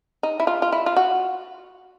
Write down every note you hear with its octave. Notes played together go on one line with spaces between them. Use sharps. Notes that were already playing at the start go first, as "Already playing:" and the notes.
D#4
E4
F4
F4
E4
F4
F#4